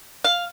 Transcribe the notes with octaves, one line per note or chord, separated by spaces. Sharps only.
F5